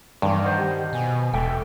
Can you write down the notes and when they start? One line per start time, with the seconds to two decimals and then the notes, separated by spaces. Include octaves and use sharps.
0.22 G2 D#3 E3 C4
0.44 C5 D#5 F#5
0.57 G4
0.93 B2 G#5
1.33 E1 G#2 A4 E5 G5